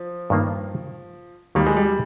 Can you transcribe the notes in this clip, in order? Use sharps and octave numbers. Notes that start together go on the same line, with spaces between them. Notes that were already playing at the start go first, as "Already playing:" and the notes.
Already playing: F3
G2 D#3 A#3 F4
D#2 D#3 G3 A#3 D#4
G#3
G3